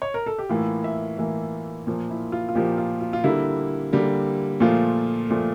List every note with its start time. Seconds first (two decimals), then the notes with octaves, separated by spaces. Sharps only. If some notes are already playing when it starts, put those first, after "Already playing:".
0.02 C#5
0.14 A#4
0.26 A4
0.38 G4
0.49 A2 E3 A#3 F4
0.84 E5
1.18 A2 E3 A#3 E5
1.87 A#2 F3 A#3
2.10 E4
2.32 F4
2.49 F4
2.55 A#2 F3 A#3 G4
2.78 F4
3.01 F4
3.13 F4
3.24 D3 G3 A#3 E4
3.93 D3 G3 A#3
4.60 A#2 F3 A3 F4
5.30 A#2 F3 A3